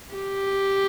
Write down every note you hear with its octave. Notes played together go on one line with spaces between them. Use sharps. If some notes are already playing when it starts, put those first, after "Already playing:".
G4